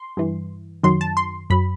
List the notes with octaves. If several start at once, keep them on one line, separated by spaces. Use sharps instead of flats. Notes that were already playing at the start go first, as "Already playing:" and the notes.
Already playing: C6
G2 E3
F#2 D#3 F#3 C6
A5
C6
F#2 F#3 B5